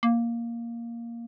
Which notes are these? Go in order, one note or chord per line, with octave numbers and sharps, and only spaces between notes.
A#3